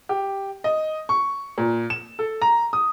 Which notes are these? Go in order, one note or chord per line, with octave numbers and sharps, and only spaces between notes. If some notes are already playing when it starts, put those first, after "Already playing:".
G4
D#5
C#6
A#2
E7
A4
A#5
D#6